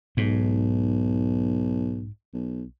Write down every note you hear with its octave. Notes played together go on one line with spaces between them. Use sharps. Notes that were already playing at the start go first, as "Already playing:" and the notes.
B1 G#2
B1